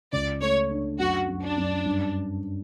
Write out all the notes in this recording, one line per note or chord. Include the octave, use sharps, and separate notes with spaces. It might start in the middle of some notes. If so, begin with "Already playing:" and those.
C#2 D5
A3 C#5
D4
F#2 F#4
F#2
D4
F#2
G2